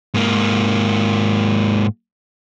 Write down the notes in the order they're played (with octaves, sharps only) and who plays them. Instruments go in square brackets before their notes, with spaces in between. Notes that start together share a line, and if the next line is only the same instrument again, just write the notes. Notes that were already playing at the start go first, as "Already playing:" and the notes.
[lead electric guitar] G#2 A#3